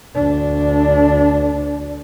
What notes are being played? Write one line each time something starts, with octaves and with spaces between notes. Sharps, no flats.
D2 D4